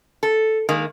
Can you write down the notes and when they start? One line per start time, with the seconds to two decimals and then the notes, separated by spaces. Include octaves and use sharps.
0.23 A4
0.69 D#3 G#3 A#3